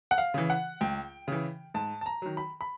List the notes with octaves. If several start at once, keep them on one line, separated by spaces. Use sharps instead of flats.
F#5
F5
C#3 E3
F#5
C#2 G5
C#3 E3
G#2 A5
A5
A#5
D#3 F#3
B5
B5